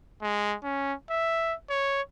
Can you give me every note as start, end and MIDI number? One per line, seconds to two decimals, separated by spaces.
0.22 0.56 56
0.64 0.93 61
1.10 1.54 76
1.70 2.02 73